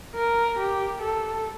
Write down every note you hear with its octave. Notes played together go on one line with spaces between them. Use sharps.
A#4
G4
A4